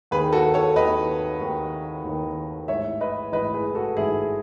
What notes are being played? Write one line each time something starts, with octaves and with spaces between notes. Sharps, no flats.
D#2 D#3 G#4 B4
F#4 A4
A4 C#5
D#2 D#3 B4 D#5
D#2 D#3
D#2 D#3
A1 G#2 E3 C#5 E5
B4 D#5
A1 G#2 E3 B4 D#5
G#4 B4
F#4 A4
A1 G#2 E3 E4 G#4
G#4